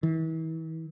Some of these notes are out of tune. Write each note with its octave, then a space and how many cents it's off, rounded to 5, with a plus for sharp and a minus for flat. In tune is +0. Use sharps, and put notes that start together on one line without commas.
E3 -40